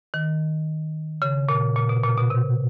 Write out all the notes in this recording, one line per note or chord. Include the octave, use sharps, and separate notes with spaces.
D#3
C#3
A#2
A#2
B2
A#2
B2
C3